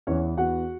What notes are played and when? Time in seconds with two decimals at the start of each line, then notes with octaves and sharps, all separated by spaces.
0.07 E2 E3 B3 C#4 C#5
0.37 E2 E3 B3 F#4 F#5